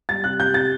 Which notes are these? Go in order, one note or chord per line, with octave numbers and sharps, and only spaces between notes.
G3 A6
C3 F#6
C3 G6
C3 A6